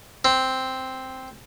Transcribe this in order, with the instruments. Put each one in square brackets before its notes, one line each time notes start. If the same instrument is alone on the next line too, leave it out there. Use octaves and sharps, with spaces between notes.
[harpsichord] C4